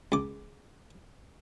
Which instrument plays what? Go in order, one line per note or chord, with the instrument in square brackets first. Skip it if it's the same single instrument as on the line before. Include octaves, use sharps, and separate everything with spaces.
[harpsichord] C#2 D6